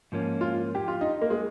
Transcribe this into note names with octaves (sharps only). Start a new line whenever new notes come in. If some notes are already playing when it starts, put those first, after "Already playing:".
G#2 F3 A#3 C#4
F4
G4
F4
D#4
A#3
G#3